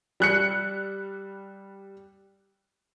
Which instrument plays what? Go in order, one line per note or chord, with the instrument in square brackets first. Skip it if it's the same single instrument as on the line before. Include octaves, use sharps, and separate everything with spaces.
[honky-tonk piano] G3 F#6 C#7